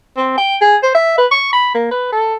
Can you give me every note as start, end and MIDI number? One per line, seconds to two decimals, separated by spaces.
0.17 0.36 60
0.38 0.56 79
0.61 0.76 68
0.83 0.91 72
0.95 1.16 76
1.18 1.26 71
1.31 1.49 85
1.53 1.70 83
1.75 1.90 58
1.91 2.10 71
2.12 2.35 69